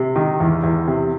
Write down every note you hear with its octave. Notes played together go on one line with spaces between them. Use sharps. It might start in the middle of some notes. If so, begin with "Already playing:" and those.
Already playing: C3
D#3
E2
E2
C3